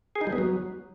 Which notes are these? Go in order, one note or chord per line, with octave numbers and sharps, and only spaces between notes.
G#4
D#4
G3
B3
F#3